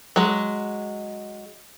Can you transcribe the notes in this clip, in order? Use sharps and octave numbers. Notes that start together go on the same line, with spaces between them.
F#3 G#3